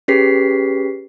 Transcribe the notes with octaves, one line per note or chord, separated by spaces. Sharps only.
C#4 G4 G#4 B4 B6 C7